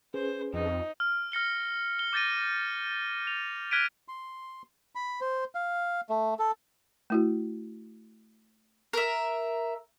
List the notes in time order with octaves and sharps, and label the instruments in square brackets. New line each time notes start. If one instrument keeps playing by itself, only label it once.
[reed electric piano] C#4 G#4 B4 [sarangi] C5
[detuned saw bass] F2 [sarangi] D#4
[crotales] F6
F6 A#6 C#7 G7
G7
D6 G6 A6 A#6 D#7
F7
F6 F#6 G#6 B6 D7 D#7
[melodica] C6
B5
C5
F5
A3
A4
[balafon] A3 E4 F#4
[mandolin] A#4 E5